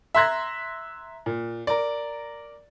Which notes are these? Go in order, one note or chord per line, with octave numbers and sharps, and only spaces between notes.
E5 A#5 C6 F#6 G#6 A#6
A#2
A#4 D5